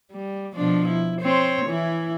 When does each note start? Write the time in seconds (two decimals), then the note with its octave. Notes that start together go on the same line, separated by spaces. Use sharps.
0.12 G3
0.54 B2 F3 D4
0.89 E4
1.21 C4 C5 C#5
1.66 E3 E4